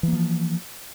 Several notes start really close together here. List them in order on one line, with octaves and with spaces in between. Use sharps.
E3 A#3 F3